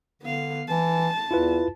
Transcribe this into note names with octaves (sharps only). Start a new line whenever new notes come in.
D3 B3 F5
E3 A5
E2 E4 F4 B4